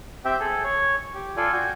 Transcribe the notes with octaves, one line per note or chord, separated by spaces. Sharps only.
C4 G4 E5 G5
G#4 A4
C#5
G4
F4 A4 D5 G#5
F#4 G5 G#5